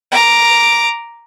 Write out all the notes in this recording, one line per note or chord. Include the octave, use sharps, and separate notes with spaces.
A#5 D6